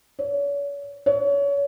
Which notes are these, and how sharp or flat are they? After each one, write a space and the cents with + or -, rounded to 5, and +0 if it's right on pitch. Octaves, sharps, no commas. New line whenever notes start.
C#5 +40
C#5 +30